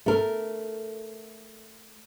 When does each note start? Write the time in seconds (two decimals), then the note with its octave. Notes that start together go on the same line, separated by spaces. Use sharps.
0.06 A3 A#4